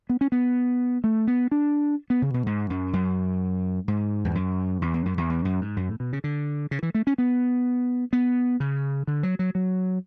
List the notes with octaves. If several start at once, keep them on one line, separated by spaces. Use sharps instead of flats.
B3
C#4
B3
A3
B3
D4
B3
C#3
B2
G#2
F#2
F#2
G#2
E2
F#2
E2
E2
F#2
E2
E2
F#2
G#2
F#2
A2
B2
C#3
D3
C#3
E3
A3
C#4
B3
B3
C#3
D3
F#3
F#3
F#3